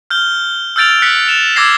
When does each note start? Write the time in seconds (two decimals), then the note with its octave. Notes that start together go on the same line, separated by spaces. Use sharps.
0.10 F6 G6 G7
0.76 E6 F6 G6 A6 D7 F7
1.02 F#6 B6 C#7
1.28 E7 F7
1.56 D6 E6 G#6 A#6 C7